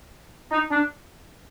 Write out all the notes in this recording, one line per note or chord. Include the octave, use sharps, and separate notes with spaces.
D#4
D4